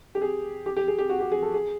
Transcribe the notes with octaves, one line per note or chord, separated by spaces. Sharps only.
G4
G#4
G4
G4
G#4
G4
F#4
G4
G#4
A4
G#4